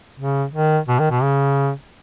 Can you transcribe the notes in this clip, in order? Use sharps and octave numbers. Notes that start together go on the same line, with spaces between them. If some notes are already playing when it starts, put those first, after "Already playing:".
C#3
D#3
B2
D#3
B2
C#3